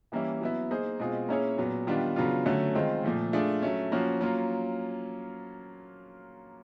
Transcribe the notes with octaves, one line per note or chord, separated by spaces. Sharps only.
E3 G3 A#3 C#4 E4
F#3 B3 E4
A#3 D#4 G#4 C5
B2 G#3 C4 F4 G#4
A#3 C#4 E4 G#4 C#5
A#2 F#3 B3
D#3 G3 B3 D4 F4
C#3 F#3 B3 D4 F4
D3 F#3 A3 C#4
D#3 G#3 C4 F4
A#2 F3 A3
A3 D4 F4 G#4
F#3 A3 C#4
F3 A#3 C#4 F#4
F#3 A#3 C#4 F4